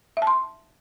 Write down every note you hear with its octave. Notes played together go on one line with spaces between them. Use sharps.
E5
A5
C6